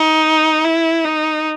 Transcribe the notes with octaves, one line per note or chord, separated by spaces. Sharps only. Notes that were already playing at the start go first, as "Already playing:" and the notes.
Already playing: D#4
E4
D#4